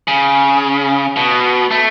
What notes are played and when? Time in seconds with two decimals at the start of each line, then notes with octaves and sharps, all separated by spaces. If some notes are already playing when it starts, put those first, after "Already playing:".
0.08 C#3
1.16 B2
1.71 A3